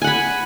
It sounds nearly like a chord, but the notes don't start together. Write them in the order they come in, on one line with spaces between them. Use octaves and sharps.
G#5 F#5 B5